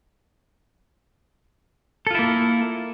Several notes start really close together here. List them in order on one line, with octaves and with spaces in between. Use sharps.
A4 F4 E4 A#3